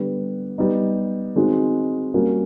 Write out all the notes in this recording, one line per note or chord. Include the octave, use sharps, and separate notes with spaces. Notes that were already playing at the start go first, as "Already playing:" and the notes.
Already playing: D3 G3 B3
G3 B3 D#4
D#3 G#3 C4 D#4 F#4
G3 A#3 C#4 F#4